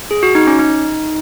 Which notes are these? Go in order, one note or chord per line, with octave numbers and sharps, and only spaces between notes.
G#4
F#4
D#4
C#4
D#4